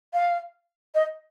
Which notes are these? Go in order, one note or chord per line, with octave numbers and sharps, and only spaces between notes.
F5
D#5